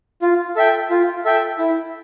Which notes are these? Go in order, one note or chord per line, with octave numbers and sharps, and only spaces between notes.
F4
A4 E5 G5
F4
A4 E5 G5
E4